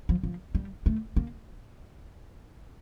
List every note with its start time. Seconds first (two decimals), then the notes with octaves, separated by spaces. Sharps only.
0.09 F3
0.23 F3
0.55 G3
0.86 A3
1.16 A#3